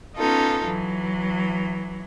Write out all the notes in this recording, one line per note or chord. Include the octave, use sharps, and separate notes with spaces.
B3 C#4 D#4 F4 A4
E3 F#3